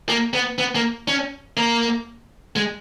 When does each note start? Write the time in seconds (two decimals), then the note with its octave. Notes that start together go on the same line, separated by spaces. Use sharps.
0.09 A#3
0.33 B3
0.58 B3
0.75 A#3
1.08 C#4
1.57 A#3
2.56 G#3